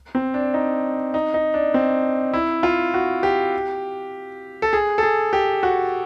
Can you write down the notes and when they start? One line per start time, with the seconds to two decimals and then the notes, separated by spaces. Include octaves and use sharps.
0.15 C4
0.34 D4
0.54 D#4
1.14 D#4
1.34 D#4
1.54 D4
1.74 C4
2.33 E4
2.63 F4
2.94 F#4
3.23 G4
4.62 A4
4.73 G#4
4.98 A4
5.03 G#4
5.33 G4
5.63 F#4